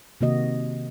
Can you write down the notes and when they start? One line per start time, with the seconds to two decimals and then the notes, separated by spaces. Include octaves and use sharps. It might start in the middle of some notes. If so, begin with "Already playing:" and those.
0.21 C3 D#3 A#3 F#4 D#5